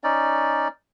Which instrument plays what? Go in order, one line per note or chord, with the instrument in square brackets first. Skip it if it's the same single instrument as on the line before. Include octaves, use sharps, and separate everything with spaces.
[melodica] C#4 D#4 D5